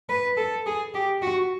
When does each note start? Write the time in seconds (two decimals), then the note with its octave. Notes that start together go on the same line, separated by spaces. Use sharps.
0.09 B4
0.37 A4
0.66 G#4
0.94 G4
1.22 F#4